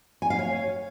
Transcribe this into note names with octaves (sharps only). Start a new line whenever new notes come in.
G#5
F5
C#5